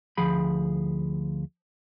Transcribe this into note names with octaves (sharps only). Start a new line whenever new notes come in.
D2 F3 G#4 B5